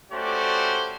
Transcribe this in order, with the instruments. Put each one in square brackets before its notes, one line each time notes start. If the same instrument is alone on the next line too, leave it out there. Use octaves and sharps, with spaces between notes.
[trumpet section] A3 C#4 F#4 G4 C5 D5